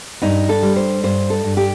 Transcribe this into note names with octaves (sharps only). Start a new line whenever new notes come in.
G2 D#4
A4
G3
C5
G2 C5
A4
G2
G4